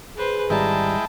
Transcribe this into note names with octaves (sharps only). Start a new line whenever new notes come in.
G#4 B4 C5
G#1 G3 G#3 E4 G5 A5 A#5